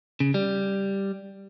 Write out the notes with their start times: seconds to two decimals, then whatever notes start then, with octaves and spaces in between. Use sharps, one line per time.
0.20 C#3
0.34 G3